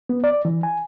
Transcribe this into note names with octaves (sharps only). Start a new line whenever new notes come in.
B3
D5
E3
G#5